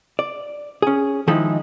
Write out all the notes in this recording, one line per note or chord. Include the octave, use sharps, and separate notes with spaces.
D5
C#4 G#4
D#3 F3 G#3 D#4 E4